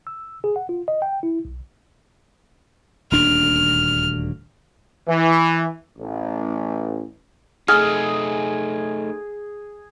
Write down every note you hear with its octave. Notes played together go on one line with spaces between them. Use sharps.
E6
G#4
F#5
F4
D#5
G5
E4
B1
D#1 D2 D4 F6
E3
A1
A3 D#4 G#4 F6